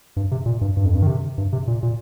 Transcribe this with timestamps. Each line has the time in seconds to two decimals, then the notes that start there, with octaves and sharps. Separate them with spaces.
0.16 G2
0.31 C3
0.46 A#2
0.61 G2
0.77 G2
0.85 F2
0.95 G2
1.03 D#3
1.07 C3
1.38 G2
1.53 C3
1.67 A#2
1.83 A#2